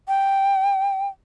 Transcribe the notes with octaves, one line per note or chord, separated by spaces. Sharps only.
G5